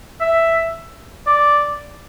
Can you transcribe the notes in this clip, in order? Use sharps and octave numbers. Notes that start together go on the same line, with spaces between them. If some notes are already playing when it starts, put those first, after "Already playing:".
E5
D5